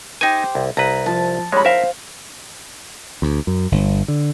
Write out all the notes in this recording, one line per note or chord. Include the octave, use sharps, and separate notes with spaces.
D#4 G4 C5 G#5
C2
C2 B4 A#5
F3 A5
G3 G#3 C#5 B5
A#4 C5 E5 F5
D2
F#2
G1
D3